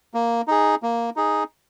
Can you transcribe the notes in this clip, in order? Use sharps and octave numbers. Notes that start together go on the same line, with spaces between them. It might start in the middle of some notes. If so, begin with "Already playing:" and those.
A#3
D#4 G#4
A#3
D#4 G#4